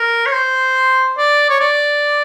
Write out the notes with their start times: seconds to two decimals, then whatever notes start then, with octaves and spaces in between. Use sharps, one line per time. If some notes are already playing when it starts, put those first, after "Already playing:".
Already playing: A#4
0.26 C#5
0.32 C5
1.18 D5
1.50 C#5
1.60 D5